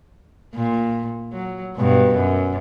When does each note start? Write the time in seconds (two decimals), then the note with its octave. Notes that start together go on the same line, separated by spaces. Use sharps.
0.55 A#2
1.33 F#3
1.76 G2 B2
2.15 F#2